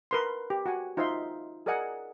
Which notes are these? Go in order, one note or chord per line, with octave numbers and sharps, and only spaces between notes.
A#4 B4 C6
G4
F#4 F#5 G#5
D#4 F4 C5 D#5 E5 C6
G#4 A#4 D5 D#5 F#5 G#5